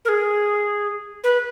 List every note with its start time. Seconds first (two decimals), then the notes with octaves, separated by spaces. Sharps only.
0.05 A#4
0.09 G#4
1.24 B4